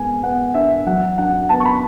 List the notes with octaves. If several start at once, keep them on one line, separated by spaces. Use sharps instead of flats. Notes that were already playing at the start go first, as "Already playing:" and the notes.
Already playing: G#3 B3 G#5
B3 F#5
D4 E5
F#3 F#5
D4 F#5
B3 A5
C#6
B5